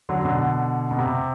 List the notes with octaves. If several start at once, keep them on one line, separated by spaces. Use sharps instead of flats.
D3 F#3
B2 D3
B2
C3